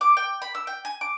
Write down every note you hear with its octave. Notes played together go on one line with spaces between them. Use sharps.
D6
G5
B5
E6
G5
G#5
D6